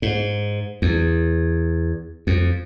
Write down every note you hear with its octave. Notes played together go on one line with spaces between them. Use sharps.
G#2
E2
F2